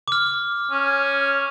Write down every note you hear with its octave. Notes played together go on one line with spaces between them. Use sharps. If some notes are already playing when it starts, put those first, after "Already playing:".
D6 F6
C#4